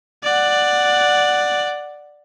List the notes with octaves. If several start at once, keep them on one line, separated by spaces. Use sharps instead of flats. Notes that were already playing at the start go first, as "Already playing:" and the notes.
D5 F#5